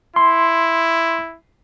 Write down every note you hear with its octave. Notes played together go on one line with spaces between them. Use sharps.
E4 C6